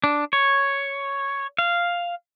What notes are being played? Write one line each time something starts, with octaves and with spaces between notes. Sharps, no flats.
D4
C#5
F5